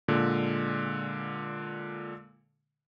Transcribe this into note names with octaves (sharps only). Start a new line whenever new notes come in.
A#2 D3 G#3